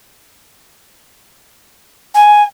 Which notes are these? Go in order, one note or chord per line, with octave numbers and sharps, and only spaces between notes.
G#5